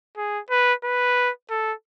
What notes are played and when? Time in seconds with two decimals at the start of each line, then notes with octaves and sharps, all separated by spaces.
0.17 G#4
0.50 B4
0.84 B4
1.50 A4